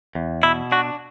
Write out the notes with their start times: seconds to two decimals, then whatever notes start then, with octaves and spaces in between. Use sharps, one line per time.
0.15 E2
0.43 B2 E4
0.72 D4 F#4